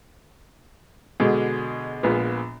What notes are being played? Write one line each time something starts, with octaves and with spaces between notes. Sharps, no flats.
B2 D3 G#3
A#1 G#3 B3 F4